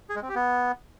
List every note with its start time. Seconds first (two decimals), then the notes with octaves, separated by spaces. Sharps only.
0.09 G#4
0.16 G#3
0.22 C4
0.29 G4
0.35 B3